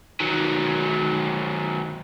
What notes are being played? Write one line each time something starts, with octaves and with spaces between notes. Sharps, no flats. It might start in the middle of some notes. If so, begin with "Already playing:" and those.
D#3 F#3